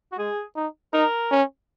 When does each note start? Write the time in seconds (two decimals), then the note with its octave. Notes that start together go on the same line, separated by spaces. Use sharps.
0.12 F#4
0.18 G#3 G#4
0.56 D#4
0.93 D#4 A#4
1.31 C#4